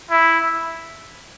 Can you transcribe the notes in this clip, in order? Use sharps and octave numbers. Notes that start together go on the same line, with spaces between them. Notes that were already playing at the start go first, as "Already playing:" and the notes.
E4